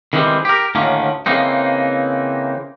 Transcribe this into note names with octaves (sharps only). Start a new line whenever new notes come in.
D#3 E3 G3 G#3 C4
G4 A#4
D2 A2 D3 D#3 A#3 C#4
C#3 E3 A#3 C4 D#4